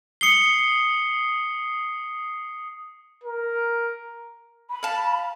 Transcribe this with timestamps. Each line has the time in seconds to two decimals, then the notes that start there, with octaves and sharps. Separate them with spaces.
0.21 D#6 C7 C#7 G7
3.23 A#4
4.70 B5
4.83 F5 A5